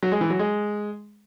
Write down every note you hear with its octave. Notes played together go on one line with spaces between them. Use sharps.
F#3
G#3
E3
F#3
G#3